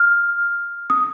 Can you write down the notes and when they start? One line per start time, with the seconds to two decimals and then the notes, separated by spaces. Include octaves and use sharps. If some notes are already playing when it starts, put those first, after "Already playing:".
Already playing: F6
0.90 D#6